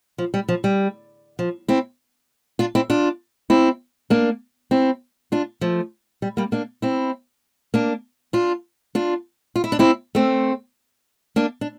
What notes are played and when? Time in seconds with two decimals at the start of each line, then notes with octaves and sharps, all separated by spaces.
0.18 F3
0.34 G3
0.49 F3
0.64 G3
1.39 F3
1.68 C4 E4
2.59 D4 F4
2.75 C4 E4
2.90 D4 F4
3.50 C4 E4
4.10 A#3 D4
4.71 C4 E4
5.32 D4 F4
5.61 F3 A3
6.22 G3
6.37 G3 A#3
6.52 A#3 D4
6.82 C4 E4
7.74 A#3 D4
8.33 D4 F4
8.95 D4 F4
9.56 F4
9.64 E4
9.72 D4
9.79 C4 E4
10.15 A3 C4
11.36 A#3 D4
11.61 D4